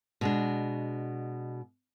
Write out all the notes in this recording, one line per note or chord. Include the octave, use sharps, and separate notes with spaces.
B2 G#3 D4